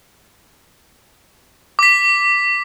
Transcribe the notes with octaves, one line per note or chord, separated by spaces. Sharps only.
D6 B6